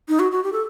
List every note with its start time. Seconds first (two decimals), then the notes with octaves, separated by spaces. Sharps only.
0.08 D#4
0.19 F#4
0.32 F#4
0.44 G4
0.53 A4